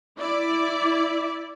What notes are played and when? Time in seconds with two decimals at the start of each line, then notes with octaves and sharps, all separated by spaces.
0.18 E4 D5